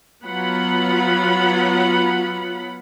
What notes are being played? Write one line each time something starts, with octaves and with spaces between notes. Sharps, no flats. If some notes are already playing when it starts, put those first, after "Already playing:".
F#3 B3 F4 F#5 B5